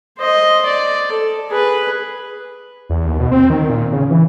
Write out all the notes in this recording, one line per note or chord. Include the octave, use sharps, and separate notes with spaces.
C5 D#5
D5
A4
G#4 B4
E2
D#2
B2
C4
D#3
A#2
C#3
E3